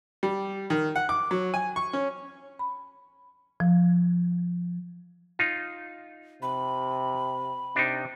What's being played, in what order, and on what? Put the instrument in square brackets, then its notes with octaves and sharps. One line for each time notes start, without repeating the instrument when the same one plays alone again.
[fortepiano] G3
D#3
F#5
D6
F#3
G#5
C#6
C#4
[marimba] B5
F3
[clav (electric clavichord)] D#4 F4
[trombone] C3 [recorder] B5
[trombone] C3 [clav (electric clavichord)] D4 D#4